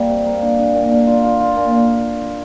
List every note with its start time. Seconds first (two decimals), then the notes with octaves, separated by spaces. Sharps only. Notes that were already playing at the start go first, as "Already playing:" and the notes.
Already playing: G3 A#3
0.09 C3
0.26 A#3
0.42 D4
0.59 D4
0.75 A#2
0.91 D4
1.07 F4
1.24 F4
1.40 F4
1.57 A#2